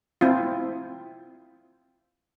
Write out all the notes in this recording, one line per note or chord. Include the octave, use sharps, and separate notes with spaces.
C4 E4 F4